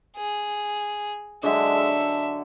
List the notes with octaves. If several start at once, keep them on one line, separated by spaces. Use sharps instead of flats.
G#4
D3 F#3 G#3 E5
A4